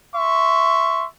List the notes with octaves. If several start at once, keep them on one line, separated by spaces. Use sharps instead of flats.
E5 C6 C#6